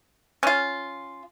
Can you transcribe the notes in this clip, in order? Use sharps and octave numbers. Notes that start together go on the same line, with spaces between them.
C#4 F4